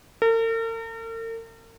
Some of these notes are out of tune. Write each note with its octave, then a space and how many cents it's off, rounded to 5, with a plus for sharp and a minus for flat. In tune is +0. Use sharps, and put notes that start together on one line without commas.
A#4 -45